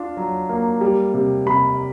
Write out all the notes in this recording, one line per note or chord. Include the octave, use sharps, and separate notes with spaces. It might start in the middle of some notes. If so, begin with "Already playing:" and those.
Already playing: D4 F4
F#3
A#3
G3
C3
C3 B5